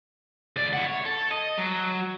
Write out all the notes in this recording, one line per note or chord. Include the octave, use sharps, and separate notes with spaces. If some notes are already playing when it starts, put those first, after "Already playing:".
C#2 D5
E4 F#5
C#5
A4
D#5
F#3